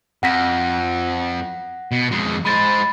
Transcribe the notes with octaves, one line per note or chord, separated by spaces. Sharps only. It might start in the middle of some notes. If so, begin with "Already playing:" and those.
F2 F#5 A#6 B6
B2
F2 G#3
G#3 C5 B5 A6